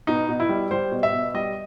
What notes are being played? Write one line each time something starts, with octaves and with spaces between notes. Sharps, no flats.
B2 D#4
B2
E4
G3
G3 C5
B2
E5
B2
G3 D#5